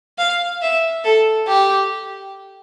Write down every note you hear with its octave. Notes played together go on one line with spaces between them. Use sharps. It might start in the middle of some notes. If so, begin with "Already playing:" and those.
F5
E5
A4
G4